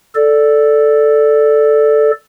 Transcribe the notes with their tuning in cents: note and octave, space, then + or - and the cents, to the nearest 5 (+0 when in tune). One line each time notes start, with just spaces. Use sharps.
A4 +0 D5 +0